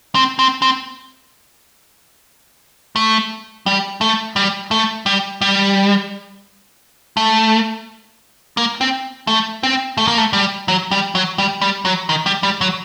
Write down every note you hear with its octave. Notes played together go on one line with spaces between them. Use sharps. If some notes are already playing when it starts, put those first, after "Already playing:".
C4
C4
C4
A3
G3
A3
G3
A3
G3
G3
A3
A#3
C4
A3
C4
A3
A#3
A3
G3
F#3
G3
F#3
G3
G3
F#3
D#3
G3
G3
F#3